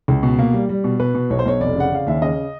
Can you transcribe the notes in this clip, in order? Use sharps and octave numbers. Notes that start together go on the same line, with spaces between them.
C#2
B2
A#3
G3
G3
B2
B2 B4
B2
B1 C#5
C5
B1 C#5
F1 D5
C#3 F#5
C#3 F5
D#2 E5
C#3 D#5